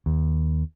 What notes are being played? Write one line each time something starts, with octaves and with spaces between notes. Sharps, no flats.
D#2